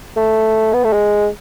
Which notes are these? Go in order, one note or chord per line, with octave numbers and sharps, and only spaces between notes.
A3
B3
A3
G#3